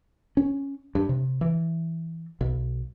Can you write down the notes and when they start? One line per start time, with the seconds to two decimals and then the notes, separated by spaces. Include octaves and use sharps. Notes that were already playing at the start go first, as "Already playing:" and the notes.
0.37 C#4
0.95 G2
1.09 C3
1.41 E3
2.41 B1